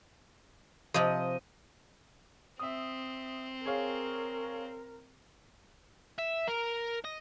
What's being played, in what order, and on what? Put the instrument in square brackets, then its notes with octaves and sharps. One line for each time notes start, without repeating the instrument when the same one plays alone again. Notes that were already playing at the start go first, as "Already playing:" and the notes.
[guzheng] C3 F3 [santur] D#5
[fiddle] C4 [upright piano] E5 D#6
[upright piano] G#4 C#5 F5 [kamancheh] A#4
[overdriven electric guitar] E5
A#4
D#5